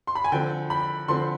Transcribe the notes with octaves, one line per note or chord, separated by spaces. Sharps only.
C6
B5
G#5
D3 F3 C4 G5
B5
D3 F3 C4 C6